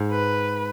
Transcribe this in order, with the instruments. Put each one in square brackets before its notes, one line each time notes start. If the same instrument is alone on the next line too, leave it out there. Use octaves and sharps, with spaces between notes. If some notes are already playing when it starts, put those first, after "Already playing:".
Already playing: [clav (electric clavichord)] G#2
[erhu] B4